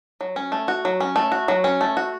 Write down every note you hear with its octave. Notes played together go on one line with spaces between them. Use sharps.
F#3
C#4
A3
F#4
F#3
C#4
A3
F#4
F#3
C#4
A3
F#4